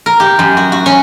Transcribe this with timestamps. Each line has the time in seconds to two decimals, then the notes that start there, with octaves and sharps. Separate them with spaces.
0.06 A#4
0.20 G4
0.39 F#2
0.57 F#4
0.72 F#4
0.86 C#4